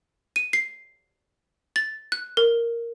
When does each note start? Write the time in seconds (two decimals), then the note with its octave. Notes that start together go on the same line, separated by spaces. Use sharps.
0.36 D#7
0.53 C7
1.76 A6
2.12 F#6
2.37 A#4